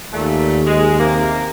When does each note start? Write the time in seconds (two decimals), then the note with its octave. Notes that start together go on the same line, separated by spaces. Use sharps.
0.12 D#2 A#2 A3
0.65 G#3
0.99 C3 A#3